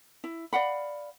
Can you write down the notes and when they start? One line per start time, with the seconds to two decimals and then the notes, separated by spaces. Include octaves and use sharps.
0.24 E4
0.53 D5 F5 F#5 B5